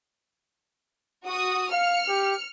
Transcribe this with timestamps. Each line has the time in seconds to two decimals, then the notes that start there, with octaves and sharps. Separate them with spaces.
1.25 F#4 D#6
1.72 F5 F6 C#7
2.08 G4